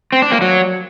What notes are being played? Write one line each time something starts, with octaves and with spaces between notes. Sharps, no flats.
C4
D4
A#3
F#3